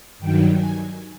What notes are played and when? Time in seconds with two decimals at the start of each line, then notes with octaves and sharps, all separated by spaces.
0.19 G2 D#3 F#3 G5
0.56 G#5